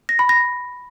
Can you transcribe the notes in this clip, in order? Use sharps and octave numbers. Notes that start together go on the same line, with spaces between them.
A#6
B5
A#6